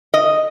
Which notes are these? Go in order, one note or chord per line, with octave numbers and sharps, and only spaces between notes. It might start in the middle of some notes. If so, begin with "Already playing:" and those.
D#5